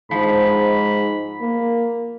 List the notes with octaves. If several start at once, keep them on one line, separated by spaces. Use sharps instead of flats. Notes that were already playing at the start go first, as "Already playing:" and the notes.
G#2 F3 B5
A#3